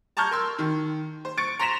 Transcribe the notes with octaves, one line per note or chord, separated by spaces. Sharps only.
A5 A#5 C#6 F6 G6 G#6
A#4 C6 E6
D#3
C5
C#6 A6 C#7 D7
A#5 C6 A#6 B6 E7 F7